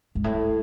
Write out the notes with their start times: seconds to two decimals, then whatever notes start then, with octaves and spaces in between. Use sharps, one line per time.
0.15 G#2
0.24 A2